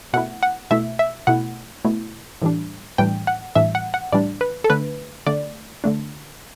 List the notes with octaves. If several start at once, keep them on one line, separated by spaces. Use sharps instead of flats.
B2 A3 E4 F#5
F#5
B2 A3 E4 E5
E5
B2 A3 E4 F#5
B2 A3 E4
A2 E3 G3 D4
A2 E3 G3 D4 G5
F#5
A2 E3 G3 D4 E5
F#5
F#5
A2 E3 G3 D4 D5
B4
A4
D3 A3 D4 B4
D3 A3 D4 D5
D3 A3 D4